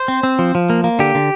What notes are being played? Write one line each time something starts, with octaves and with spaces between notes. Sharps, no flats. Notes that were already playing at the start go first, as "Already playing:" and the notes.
Already playing: C5
C4
C4
F3
F3
A#3
A#3
D3 G4
D3